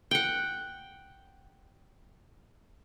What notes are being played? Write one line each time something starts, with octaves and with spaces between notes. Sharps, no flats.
F#5 G5